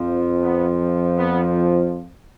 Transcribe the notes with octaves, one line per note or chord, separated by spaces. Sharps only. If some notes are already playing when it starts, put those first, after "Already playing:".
Already playing: F2 F3
B3
B3